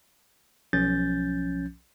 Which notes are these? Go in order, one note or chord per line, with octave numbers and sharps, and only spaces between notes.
B1 F3 C#4 G6 A6